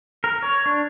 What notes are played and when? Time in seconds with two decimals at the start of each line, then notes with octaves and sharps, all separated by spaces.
0.24 A#4
0.42 C#5
0.66 D4